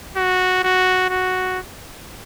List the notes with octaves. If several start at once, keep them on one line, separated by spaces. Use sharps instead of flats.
F#4
F#4
F#4